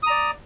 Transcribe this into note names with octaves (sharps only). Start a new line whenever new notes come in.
D5 A#5 D#6